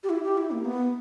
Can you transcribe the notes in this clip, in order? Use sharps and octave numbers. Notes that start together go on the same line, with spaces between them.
G4
E4
G4
E4
A#3
B3